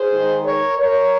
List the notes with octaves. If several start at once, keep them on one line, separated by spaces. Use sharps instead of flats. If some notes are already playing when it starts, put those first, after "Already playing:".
Already playing: G#4 C5
D#3 G#3 D#4
A#4 C#5
A#4 C#5